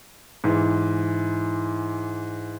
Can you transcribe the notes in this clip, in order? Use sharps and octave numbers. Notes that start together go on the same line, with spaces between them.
G#2 E3